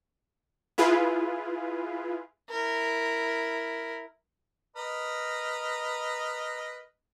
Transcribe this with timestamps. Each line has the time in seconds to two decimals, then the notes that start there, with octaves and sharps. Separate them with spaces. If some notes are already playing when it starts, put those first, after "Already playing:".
0.78 E4 F4 G#4 B4
2.50 E4 A#4
4.76 A#4 B4 D#5